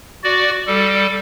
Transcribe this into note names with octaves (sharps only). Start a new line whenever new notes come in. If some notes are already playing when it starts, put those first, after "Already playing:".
F#4 D5
G3 A4